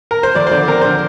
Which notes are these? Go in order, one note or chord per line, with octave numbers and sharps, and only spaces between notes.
A#4
C5
F2 D5
C5
D3 D5
C4 A#4
D3 C5